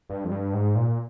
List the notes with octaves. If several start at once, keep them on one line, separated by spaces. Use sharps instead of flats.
G2
F2
G2
G#2
A#2